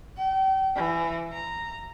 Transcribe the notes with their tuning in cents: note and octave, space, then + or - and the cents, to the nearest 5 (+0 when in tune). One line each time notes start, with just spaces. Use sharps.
G5 -35
E3 +20
A#5 -10